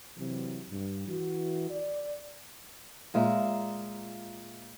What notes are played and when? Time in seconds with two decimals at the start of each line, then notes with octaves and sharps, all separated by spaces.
0.16 C3 E3 F#3
0.70 G2
1.07 E3 F#4
1.70 D5
3.14 A#2 G#3 F4 E5 A#5